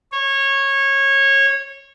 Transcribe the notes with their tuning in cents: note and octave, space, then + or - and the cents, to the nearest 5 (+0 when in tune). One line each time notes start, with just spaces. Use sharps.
C#5 -20